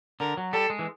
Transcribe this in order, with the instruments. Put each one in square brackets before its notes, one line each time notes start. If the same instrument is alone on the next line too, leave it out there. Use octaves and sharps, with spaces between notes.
[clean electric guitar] D3 [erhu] A#4
[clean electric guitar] F#3
[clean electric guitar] G3 [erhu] A4
[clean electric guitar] G#3
E3